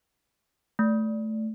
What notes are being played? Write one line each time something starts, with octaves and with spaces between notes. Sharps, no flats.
A3